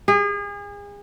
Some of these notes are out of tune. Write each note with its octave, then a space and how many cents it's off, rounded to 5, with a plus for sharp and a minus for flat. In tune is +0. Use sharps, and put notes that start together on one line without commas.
G#4 -35